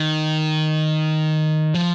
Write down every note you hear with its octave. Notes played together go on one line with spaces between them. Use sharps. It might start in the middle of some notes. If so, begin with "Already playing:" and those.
Already playing: D#3
F3